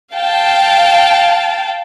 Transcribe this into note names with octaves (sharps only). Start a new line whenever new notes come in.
F5 G5 A5